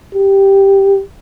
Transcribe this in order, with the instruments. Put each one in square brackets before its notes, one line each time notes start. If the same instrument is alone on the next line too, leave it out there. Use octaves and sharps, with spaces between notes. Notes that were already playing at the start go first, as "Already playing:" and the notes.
[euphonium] G4